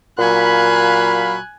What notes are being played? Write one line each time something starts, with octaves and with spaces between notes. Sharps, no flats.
A#2 F#3 F5 G#5 B5 F#6